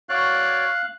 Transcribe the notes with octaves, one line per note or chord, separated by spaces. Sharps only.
F#4 C#5 D5 F5 F#6